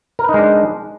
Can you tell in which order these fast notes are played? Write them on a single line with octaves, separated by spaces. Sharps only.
A#4 B4 D#4 G#3 D4